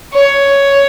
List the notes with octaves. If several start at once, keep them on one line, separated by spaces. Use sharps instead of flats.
C#5